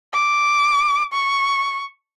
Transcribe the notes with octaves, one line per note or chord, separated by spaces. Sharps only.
D6
C#6